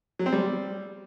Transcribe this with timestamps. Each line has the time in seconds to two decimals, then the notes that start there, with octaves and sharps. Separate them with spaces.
0.19 F#3
0.26 C4
0.33 G3